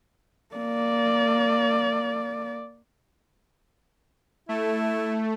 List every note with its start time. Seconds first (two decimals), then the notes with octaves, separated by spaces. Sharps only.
0.55 A#3 D5
4.49 A3 E4